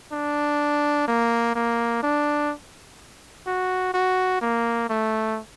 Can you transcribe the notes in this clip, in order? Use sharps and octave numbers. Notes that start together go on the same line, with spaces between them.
D4
A#3
A#3
D4
F#4
F#4
A#3
A3